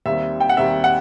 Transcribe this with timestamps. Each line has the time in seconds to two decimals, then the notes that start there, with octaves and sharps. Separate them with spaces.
0.06 D#2 D#3 G3 C4 E5
0.40 G5
0.49 F#5
0.57 D#2 D#3 G3 C4 E5
0.84 F#5